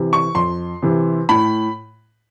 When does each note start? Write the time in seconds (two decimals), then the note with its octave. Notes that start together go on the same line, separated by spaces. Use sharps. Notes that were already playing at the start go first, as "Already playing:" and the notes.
Already playing: C3 E3
0.13 C#6
0.35 F2 C6
0.82 C3 E3
1.29 A2 B5